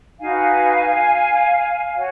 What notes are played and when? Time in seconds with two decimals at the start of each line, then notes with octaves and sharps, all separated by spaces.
0.20 D#4 F#4 B4 F5 G#5
1.95 F#4 C#5